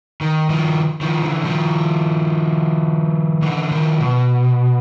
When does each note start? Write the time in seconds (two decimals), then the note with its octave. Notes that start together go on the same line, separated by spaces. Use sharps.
0.21 D#3
0.50 D#3 F3
1.01 D#3 F3
1.23 D3 E3
1.45 D#3 F3
3.42 D3 E3
3.71 D#3 F3
4.01 B2